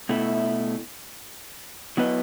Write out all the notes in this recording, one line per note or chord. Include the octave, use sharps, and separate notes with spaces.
B2 A3 E4
F#3 B3 E4 B4 D#5